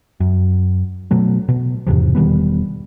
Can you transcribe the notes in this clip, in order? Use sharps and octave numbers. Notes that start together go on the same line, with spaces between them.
F#2
B2 F#3 A3
B2
E2 G#2 C3 F3
E1 D#3 G3 B3